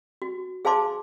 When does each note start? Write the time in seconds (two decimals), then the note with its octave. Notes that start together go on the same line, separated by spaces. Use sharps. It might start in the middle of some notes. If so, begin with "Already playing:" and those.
0.22 F#4
0.65 G#4 C5 F5 A5 C6 D6